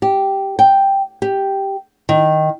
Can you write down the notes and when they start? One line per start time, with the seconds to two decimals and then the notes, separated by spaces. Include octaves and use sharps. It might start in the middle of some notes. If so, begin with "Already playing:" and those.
0.02 G4
0.59 G5
1.22 G4
2.09 D#3